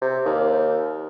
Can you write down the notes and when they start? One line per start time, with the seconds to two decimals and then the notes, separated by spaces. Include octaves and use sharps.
0.02 C3
0.25 D#2